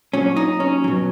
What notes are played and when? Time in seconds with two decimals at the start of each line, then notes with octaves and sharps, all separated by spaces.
0.13 A#2 F#3 C#4
0.37 D#4
0.60 C#4
0.84 B2 F#3